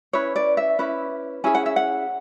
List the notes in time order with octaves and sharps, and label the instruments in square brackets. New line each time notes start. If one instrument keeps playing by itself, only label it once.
[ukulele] C#4 E4 B4 C#5
D5
E5
C#4 E4 B4
C#4 E4 G#4 G#5
F#5
E5
F#5